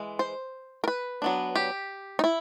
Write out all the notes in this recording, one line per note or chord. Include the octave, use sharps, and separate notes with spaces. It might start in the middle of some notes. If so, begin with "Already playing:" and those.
Already playing: E3 G#3
C5
A#4
B4
F#3 B3 D4
G4
D#4
E4